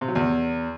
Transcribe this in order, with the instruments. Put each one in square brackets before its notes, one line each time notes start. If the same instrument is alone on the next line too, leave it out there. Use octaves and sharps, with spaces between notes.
[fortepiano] C3
F#3
E2